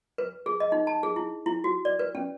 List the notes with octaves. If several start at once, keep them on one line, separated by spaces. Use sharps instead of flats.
B4
G#4
D#5
D#4
A5
G#4
E4
E4
F#4
D5
B4
C#4